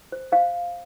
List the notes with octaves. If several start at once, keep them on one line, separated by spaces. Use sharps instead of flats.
C5
C5 F5